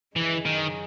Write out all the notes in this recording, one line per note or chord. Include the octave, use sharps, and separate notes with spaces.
F#2 C#3 E3 G#3
D#3